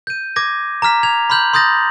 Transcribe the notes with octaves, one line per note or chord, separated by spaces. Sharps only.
G6 D#7
D6 G#6 A#6
A#5 D6 F6 B6
G#6 F7
B5 C6 F6 G6 F#7
C6 D#6 G6 A6 A#6